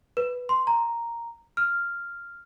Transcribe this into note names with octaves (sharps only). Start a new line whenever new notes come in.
B4
C6
A#5
F6